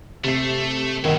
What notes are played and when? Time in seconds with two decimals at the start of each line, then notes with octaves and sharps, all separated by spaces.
0.24 C3 A3 C7
1.04 G1 A#2 D#3 E4 F#5